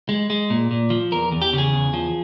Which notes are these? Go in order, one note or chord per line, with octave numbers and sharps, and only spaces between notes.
G#3
G#3
A#2
A#2
F3
E2 A#4
E2
G4
C#3
G#4
E2
F3